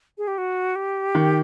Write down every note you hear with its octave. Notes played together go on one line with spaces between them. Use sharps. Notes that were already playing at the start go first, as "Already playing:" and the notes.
G#4
G4
F#4
G4
D#3